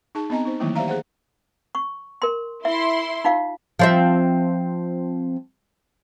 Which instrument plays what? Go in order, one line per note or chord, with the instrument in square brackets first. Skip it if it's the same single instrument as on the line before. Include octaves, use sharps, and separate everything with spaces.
[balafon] D#4 G#4 A5
B3 C4 D#5 G#5 A#5
D#4 C5
D#3 E3 F#3 A3 A#3 E4
G4 C5 D5 E5 F5 A#5
G#4 C5 F#5
[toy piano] C#6
A#4 C6
[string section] E4 C6 [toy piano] E5
[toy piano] D#4 F4 F5
[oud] F3 C4 E5